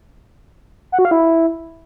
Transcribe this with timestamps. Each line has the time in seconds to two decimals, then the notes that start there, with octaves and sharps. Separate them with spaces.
0.92 F#5
0.99 F#4
1.05 F5
1.11 E4